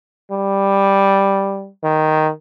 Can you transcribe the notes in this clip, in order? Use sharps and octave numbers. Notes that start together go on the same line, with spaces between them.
G3
D#3